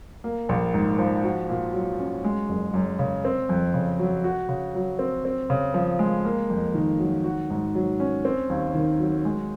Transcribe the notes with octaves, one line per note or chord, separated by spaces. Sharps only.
A#3
A#1
G#2
F3
F#4
A#2
F#3
C#4
G#3
F#1
F#2
C#3
C4
F2
C#3
F#3
F#4
C#3
F#3
C4
C4
C#3
F3
G#3
A#3
F2
D#3
F#3
F#4
G#2
F#3
C#4
C4
D#2
D#3
F#3
G#3